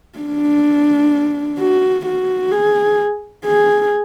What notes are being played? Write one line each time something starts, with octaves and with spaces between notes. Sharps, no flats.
D4
F#4
F#4
G#4
G#4